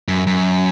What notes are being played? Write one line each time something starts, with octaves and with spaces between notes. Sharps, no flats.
F#2
F#2